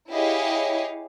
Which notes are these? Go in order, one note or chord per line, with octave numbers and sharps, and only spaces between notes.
E4 G4 G#4 C#5 D#5 F5